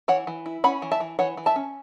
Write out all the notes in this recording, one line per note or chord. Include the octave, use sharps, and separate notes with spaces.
E3 C#5 F#5
E3
E4
C#4 F#5 B5
E3
E5 A5
E3
E3 C#5 F#5
E3
E5 A5
C#4